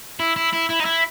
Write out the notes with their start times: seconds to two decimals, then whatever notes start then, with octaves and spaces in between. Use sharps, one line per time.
0.19 E4
0.36 E4
0.53 E4
0.70 E4
0.81 D#4
0.85 E4